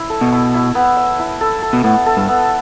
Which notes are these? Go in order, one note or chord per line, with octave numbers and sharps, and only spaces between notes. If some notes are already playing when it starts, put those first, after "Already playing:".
Already playing: E4
A4
B2
E4
E4
B3
E5
E4
A4
A4
B2
A2 B3
A4
G2
B3